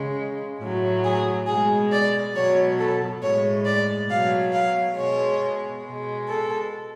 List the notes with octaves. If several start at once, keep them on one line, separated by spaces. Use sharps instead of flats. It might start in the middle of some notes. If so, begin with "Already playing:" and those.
Already playing: C#3 G#3
A2 F#3
G#4
B2 G#3 G#4
D5
B2 F#3 C#5
A4
A2 G#3 C#5
D5
B2 F#3 F5
F5
B2 G#3 C#5
B2 G#3
A4